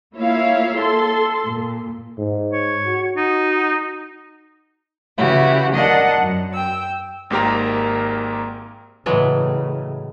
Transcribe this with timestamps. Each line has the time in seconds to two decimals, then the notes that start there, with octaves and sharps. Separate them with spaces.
0.18 A#3 E4 F4 C#5 E5 F5
0.77 A4 C6
1.47 A#2
2.18 G#2
2.53 C#5
2.86 F#4
3.16 D#4
5.17 C#3 E3 E4 F#4 G4
5.75 D4 A#4 D#5 F#5 A5
6.21 F#2
6.53 G5 E6
7.30 G#1 G#2 A#3 G4 A#4 A#5
9.06 A2 C#3 E3 F#3 G#3